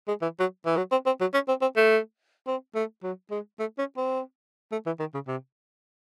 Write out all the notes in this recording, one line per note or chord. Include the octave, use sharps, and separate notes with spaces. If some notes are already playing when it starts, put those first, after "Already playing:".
G#3
E3
F#3
E3
F#3
C4
C4
F#3
C#4
C4
C4
A3
C4
A3
F#3
G#3
A3
C#4
C4
A3
E3
D#3
C#3
C3